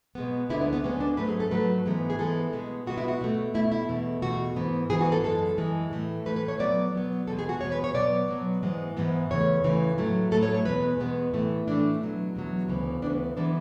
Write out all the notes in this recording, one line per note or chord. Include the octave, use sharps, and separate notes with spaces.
B2 G#3 B3
D2 D3 G#3 B3 E4
B3
B3
D2 D3 G#3 B3 C#4
D4
G#2 F#3 A3 B4
G#4
A4
G#2 F#3 A3 B4
G#2 E3 G#3 B3
G#4
G#2 E3 G#3 B3 A4
B2 G#3 B3
B2 G#3 B3 F#4
E4
F#4
B2 A3
B2 A3 E4
E4
E2 B2 A3
E2 B2 A3 F#4
G#2 E3 B3
G#2 E3 B3 G#4
F#4
A4
F#2 E3 G#3 A4
F#2 E3 G#3
A2 E3 A3
A2 E3 A3 B4
B4
C#5
B2 F#3 B3 D5
B2 F#3 B3
E2 B2 G#3 B3 A4
G#4
F#4
E2 B2 G#3 B3 C#5
B4
C#5
B2 F#3 B3 D5
B2 F#3 B3
G#2 E3 G#3 B3
G#2 E3 G#3 B3
E2 C#3 E3 A3 C#5
E2 C#3 E3 A3
A2 F#3 A3
A2 F#3 A3 A4
C#5
C#5
E2 B2 G#3 B3 B4
E2 B2 G#3 B3
A2 E3 A3
A2 E3 A3 D4
E2 B2 F#3
E2 B2 F#3
D2 C#3 E3 B3
D2 C#3 E3 B3 D4
E3 G#3 B3 D4